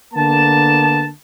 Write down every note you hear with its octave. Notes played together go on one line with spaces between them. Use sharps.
D3 A#3 B3 A5